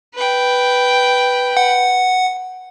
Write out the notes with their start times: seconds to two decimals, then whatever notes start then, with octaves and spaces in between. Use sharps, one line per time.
0.15 B4 G5
1.57 F#5